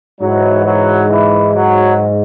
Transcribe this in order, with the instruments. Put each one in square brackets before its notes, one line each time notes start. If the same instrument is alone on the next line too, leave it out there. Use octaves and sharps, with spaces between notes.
[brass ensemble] G#2 E3 F#3
F#3
E3
F#3